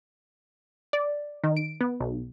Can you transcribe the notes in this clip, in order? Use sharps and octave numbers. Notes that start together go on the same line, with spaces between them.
D5
D#3
D7
B3
B1